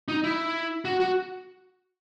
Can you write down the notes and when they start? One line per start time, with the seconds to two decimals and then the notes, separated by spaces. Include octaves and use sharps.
0.08 D#4
0.24 E4
0.85 F#4
1.00 F#4